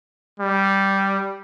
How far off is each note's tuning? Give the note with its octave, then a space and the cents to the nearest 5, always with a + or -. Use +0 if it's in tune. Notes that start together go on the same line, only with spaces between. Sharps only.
G3 -5